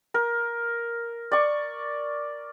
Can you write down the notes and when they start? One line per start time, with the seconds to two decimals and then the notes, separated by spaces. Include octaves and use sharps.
0.14 A#4
1.32 D5 C#6